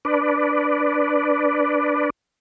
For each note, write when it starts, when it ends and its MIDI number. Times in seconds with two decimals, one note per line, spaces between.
0.05 2.10 62
0.05 2.10 71
0.05 2.10 74